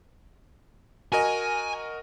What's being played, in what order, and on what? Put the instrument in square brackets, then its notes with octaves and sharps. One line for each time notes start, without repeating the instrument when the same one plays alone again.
[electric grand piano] F#4 A#4 D#5 [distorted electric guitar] G#5